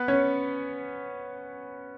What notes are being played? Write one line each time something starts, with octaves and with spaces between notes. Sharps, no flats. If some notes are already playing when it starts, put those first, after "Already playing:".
Already playing: B3 B4
C#4 C#5